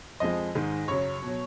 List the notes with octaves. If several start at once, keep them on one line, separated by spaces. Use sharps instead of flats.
F2 F3 G#3 D#5
G#2 D#3 G#3
F#2 C#3 F#3 C#5
B2
F#3